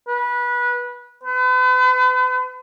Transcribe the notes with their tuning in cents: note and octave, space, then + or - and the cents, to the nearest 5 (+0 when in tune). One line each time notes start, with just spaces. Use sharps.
B4 -20
B4 +40